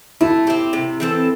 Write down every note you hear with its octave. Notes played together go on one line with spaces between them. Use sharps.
A3 E4
C4 G4
C3
E3 C4 A4